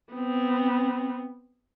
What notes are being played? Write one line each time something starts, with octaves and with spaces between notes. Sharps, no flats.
B3 C4